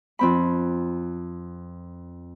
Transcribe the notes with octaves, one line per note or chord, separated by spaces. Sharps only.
F2 C4 B5